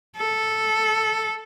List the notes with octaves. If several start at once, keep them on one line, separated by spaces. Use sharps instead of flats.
A4